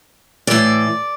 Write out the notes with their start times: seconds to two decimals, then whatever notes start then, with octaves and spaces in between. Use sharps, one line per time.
0.47 A2 E3 D5